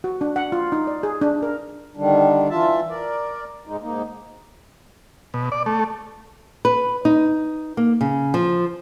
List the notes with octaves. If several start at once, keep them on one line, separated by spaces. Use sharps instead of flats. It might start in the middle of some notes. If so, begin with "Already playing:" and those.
F#4
D4
F#5
F4
D#4
D5
G#4
D4
A#4
D3 D#3 G3 D4
E3 F4 E5 A5
A#4 D5
G#2 G#3 D#4
G#2 A#3 D#4
B2
D5
A3
B4
D#4
A#3
C#3
F3